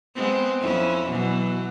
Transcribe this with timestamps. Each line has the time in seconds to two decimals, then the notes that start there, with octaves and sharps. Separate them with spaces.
0.15 G#3 B3 C4
0.61 F2 C#4 E4
1.08 B2 E3 F#3